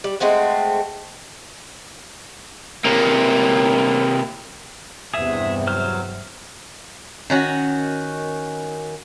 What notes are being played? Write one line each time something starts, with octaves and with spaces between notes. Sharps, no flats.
G3
G#3 A3 C4 F#4
C3 A#3
E2 G2 C3 G#4 E5
F#3 C5 F6
D#3 C#4 F#4